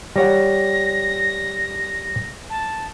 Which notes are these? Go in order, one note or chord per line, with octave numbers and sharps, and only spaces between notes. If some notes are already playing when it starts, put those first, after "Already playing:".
G3 C#5 F#5 A#6
A5